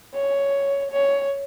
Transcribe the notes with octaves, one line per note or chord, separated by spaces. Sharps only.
C#5
C#5